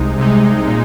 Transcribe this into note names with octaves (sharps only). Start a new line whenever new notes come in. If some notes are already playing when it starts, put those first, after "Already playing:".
Already playing: C2 C3 G#3 D#4
C2 C3 G#3 D#4
A#2 G#3 D#4